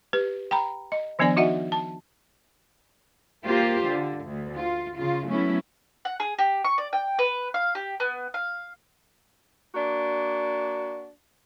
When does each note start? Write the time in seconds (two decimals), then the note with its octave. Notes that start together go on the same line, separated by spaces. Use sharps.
0.13 G4 B4
0.51 G5 A#5 B5
0.92 D#5
1.19 D#3 F3 B3 D4 D5 G#5
1.37 D#4 F#4 D#5 E5 F#5
1.72 A5
3.45 A#3 F4 G4 C5
3.88 D3
4.25 D2
4.56 F4
4.97 C#3 F4
5.27 F#3 A3 B3 C#4 E4
6.05 F#5
6.20 G#4
6.39 G4
6.65 C#6
6.78 D5
6.93 G5
7.19 B4
7.54 F5
7.75 G4
8.00 B3
8.34 F5
9.75 A#3 D4 F#4